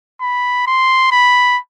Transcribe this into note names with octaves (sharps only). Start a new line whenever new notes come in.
B5
C6
B5